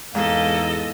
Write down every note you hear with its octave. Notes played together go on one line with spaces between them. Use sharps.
E2 G#2 A#3 A4 D#5